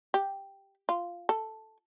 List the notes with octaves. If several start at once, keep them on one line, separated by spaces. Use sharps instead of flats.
G4
F4
A4